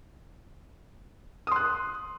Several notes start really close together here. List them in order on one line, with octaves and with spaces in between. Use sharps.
D#6 C6 F#6